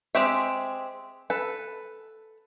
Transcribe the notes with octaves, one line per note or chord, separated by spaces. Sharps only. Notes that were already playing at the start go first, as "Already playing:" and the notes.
G#3 C4 G4 E5
A4 B4